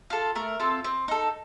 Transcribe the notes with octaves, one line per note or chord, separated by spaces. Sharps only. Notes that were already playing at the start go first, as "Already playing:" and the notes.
F4 A4
A3 A#4
C4 F4 A4
C4
D#4 A4